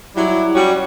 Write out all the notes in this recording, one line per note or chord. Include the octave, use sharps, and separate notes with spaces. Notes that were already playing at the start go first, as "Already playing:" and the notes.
F#3 G3 E4
G3 C#4 F#4